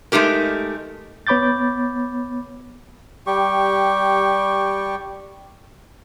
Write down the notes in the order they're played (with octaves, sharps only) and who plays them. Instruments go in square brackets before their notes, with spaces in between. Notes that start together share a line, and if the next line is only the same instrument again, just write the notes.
[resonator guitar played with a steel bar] G#3 A3 D#4 G4 A#4
[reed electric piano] B3 C#5 B5 D6 G6 A6
[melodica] G3 G4 C#6